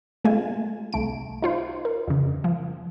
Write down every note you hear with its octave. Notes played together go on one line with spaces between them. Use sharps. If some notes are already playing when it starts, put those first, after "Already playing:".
G#3 A3 F4 G#5
C2 A3 D7
D#4 F4 C5
A#4
F2 C#3
F3